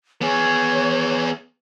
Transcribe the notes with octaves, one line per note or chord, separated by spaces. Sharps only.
B3 G#4 C#5